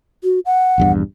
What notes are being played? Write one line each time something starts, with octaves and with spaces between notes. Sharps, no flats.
F#4
F#5
A#1 E2 G2